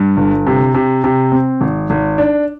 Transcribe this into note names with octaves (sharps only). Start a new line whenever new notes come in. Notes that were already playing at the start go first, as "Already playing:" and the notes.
Already playing: G2
G1
C3
C3
C3
C4
G#1
G#1
D4